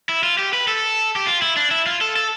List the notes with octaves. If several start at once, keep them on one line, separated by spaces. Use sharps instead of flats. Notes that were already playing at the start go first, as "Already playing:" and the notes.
E4
F4
G4
B4
A4
G4
F4
E4
D4
E4
F4
A4
A4